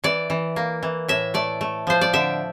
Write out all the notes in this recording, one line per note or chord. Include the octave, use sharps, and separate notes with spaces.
E3 D5
E3
A#3
E3
A2 E5
A3 D5
A3
F3 C5
D5
D3 E5